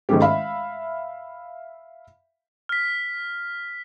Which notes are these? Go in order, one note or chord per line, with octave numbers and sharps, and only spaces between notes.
G#2 D#3 G#3 A3 C#4 G4
E5 F5 B5
F6 B6